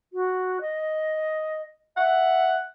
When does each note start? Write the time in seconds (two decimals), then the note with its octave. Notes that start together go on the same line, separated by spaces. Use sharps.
0.13 F#4
0.61 D#5
1.97 E5 F#5